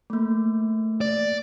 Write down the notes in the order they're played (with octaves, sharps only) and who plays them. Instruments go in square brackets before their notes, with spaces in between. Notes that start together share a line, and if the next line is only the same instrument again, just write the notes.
[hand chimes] A3 A#3
[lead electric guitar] D5